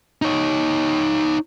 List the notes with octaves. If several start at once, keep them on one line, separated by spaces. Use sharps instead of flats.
D#4 C#5